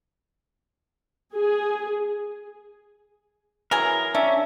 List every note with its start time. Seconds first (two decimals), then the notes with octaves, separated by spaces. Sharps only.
1.34 G#4
3.71 E3 F#3 G#4 A#4
4.15 C#4 D4 E5